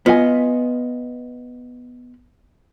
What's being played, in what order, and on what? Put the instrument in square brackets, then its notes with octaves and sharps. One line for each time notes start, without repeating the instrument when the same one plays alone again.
[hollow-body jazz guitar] B3 [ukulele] F4 D#5 G#5